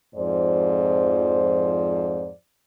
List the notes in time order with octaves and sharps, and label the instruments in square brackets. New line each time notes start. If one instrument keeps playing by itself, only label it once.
[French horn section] F2 G#2 F3 C5 D5